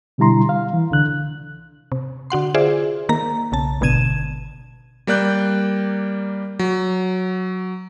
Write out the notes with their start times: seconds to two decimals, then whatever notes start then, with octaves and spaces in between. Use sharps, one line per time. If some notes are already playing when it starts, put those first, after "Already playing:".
0.18 B2 D3 G3 E4 A#5 C6
0.49 F5
0.73 E3
0.90 C2 D3 F#6
1.92 C3
2.30 D3 F#4 F#5 C6
2.54 F4 G#4 C5 D5 E5
3.09 D#3 A#3 A#5
3.52 B1 C#3 A5
3.81 G#1 B2 D3 G#6 D#7 E7
5.07 G3 A#3 D5 F#6 G6
6.59 F#3